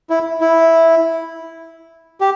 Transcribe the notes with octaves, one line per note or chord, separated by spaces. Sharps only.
E4
E4
G4